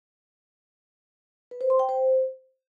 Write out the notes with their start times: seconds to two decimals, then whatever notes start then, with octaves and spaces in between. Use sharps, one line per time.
1.51 B4
1.61 C5
1.70 C6
1.79 G5
1.89 C5